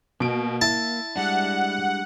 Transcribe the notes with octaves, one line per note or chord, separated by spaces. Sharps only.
B2 A#3 D7
E4 A5
G3 G#3 D4 F#5